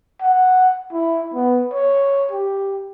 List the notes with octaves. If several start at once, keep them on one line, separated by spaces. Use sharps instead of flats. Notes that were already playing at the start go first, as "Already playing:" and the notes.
F#5
E4
B3
C#5
G4